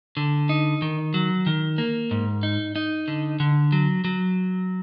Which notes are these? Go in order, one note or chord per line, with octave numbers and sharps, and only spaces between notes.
D3
D#4
D#3
F#3
D#3
A#3
G#2
D#4
D#4
D3
D3
F#3
F#3